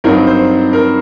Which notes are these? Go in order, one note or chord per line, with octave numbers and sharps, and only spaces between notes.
G2 F#3 C4 D#4 A#4
C5
A#4